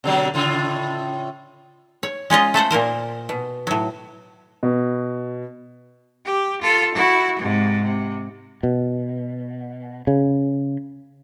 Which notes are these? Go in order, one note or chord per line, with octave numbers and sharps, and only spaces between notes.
B2 D3 F#3
A2 C#3 F4
C#5
G#3 C#4 F4 D#5
A3 A4 C5 F#5
A#2 A#3 A#4 C5
B2
A2 F#3
B2
G4
F4 A4
E4 F#4
G#2 C3
C3
B2
C#3